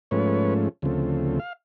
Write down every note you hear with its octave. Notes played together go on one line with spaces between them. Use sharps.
G#2 F3 A3 C#4 B4 C#5
D2 C#3 F3 A3 C4
F5